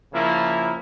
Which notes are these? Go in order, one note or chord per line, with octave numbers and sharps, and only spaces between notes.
C#3 F3 A#3 E4